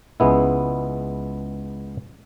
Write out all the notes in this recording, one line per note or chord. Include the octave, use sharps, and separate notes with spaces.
C#2 G#3 B3 E4